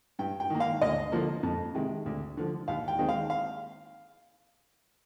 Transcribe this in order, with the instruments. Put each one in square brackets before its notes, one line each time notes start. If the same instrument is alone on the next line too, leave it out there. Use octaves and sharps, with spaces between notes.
[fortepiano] G2 G5
G5
D#3 A#3
F5
D2 D#5
D3 F3 A#3
F2
C3 D#3 G#3
D2
D3 F3
D#2 F5
G5
D#3 G#3 C4
F5
F5